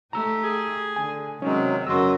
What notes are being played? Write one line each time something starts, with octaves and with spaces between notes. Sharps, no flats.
A3 D#4 G4 A#5 E6
G#4
D3 G#5
C3 D#3 F#3 G#3 C#4
F#2 C#3 F#3 B3 F#4 D#5 C6 E6